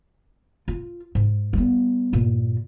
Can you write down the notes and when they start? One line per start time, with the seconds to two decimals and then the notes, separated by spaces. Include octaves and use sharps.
0.68 F4
1.15 G#2
1.53 G3 B3
2.13 G2 A#2